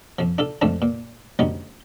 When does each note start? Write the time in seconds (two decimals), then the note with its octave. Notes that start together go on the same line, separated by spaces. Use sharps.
0.19 F2 F3
0.38 D4 F4 A4
0.61 F2 G#2 C#3 A3 C4 D4
0.82 A#2
1.39 D2 F#3 G3 C#4 D#4